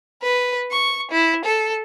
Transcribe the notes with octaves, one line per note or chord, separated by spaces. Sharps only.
B4
C#6
E4
A4